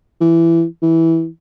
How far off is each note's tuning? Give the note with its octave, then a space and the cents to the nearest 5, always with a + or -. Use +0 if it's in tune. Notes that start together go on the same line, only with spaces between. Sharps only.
E3 +15
E3 -10